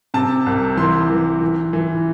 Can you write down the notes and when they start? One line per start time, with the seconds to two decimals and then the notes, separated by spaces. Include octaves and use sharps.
0.14 C3 A5
0.46 C2
0.77 E3 C6
1.10 E3
1.41 E3
1.73 E3